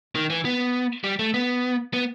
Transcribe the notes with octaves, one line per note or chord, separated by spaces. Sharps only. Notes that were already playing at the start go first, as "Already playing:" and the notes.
D#3
E3
B3
G3
A3
B3
B3